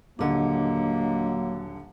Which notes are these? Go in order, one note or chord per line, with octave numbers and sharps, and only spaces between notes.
D#1 D3 F#3 A#3 D4 D#5